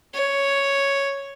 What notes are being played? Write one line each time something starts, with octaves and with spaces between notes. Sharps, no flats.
C#5